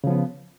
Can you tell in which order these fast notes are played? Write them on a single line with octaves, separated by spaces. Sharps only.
C#3 F3 B3